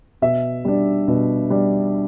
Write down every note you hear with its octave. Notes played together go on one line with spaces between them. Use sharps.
B2 E5
G3 D4
B2
G3 D4